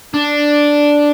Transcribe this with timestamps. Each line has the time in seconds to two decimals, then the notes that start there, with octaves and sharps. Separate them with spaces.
0.14 D4